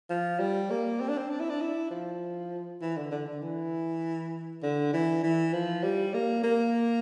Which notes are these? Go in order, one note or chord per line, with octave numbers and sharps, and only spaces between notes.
F3
G3
A#3
C4
D4
C4
D4
E4
D4
E4
F3
E3
D3
D3
D3
E3
D3
E3
E3
F3
G3
A#3
A#3